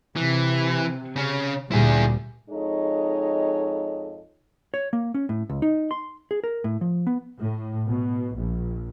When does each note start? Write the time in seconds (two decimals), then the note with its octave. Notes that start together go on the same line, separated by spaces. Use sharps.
0.16 C3 E3
1.16 C#3 C#4
1.72 D2 A#2 G3 E4 G#4
2.50 F2 G#3 D#4 A4 C#5 D#5
4.74 C#5
4.93 A#3
5.14 C#4
5.29 A2
5.50 C#2
5.62 D#4
5.91 C6
6.31 G#4
6.44 A#4
6.64 A2
6.81 F3
7.07 B3
7.39 A2
7.88 B2
8.36 A#1